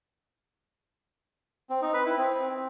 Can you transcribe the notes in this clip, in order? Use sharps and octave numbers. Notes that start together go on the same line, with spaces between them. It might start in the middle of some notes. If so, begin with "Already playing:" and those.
C4
D#4
B4
E4
C4